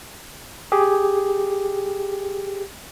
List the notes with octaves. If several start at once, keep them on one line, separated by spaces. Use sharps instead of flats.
G4 G#4